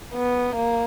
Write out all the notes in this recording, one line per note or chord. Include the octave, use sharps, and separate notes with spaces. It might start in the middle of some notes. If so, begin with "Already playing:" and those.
B3
A#3